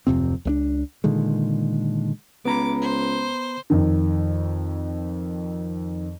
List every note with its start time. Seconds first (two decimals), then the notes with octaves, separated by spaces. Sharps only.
0.07 D1 F2 C3 C4
0.45 C#2 A3 D4
1.04 A#2 D3 D#3 G#3
2.45 C#2 B3 A#5 B5 D6
2.81 C5
3.70 F2 D#3